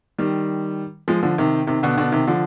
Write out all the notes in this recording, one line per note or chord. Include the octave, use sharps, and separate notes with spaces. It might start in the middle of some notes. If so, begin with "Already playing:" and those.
D#3 G3
F3 G#3
D3 F3
C3 D#3
C3 D#3
B2 D3
B2 D3
C3 D#3
D3 F3